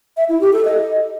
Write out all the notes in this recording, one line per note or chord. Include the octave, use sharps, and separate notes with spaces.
E5
E4
G4
A4
D#5